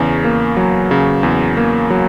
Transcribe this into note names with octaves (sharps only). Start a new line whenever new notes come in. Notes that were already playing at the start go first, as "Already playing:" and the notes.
Already playing: E2 C#3
A#3
F#3
C#3
E2
A#3
F#3